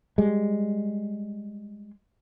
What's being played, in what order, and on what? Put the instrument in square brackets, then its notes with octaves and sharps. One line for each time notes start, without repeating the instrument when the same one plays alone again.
[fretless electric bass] G3 G#3